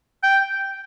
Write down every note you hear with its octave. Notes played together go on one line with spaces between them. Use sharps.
G5